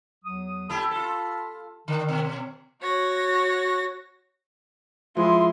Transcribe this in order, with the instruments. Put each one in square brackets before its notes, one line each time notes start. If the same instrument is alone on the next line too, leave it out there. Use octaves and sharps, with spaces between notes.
[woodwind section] E2 F#3 D#6
[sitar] A3 E4 G4 [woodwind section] A5 B5
[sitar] F4 A4
[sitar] D3 [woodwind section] D#3
[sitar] B2
[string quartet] F#4 C#5 A#6
[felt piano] F3 [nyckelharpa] G#3 C6 [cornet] E4